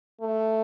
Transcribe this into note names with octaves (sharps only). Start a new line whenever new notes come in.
A3